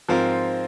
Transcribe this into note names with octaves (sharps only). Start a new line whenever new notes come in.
G#2 F3 C4 F4 A#4